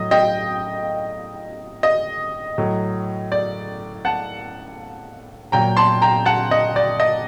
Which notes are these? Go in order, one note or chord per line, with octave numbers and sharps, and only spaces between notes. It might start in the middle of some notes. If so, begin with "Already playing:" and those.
Already playing: A2 F#3 D#5
D#5 G5
D#5
A2 F#3
D5
F#5 A5
A#2 F#3 G5 A#5
A5 C6
G5 A#5
F#5 A5
D#5
D5
D#5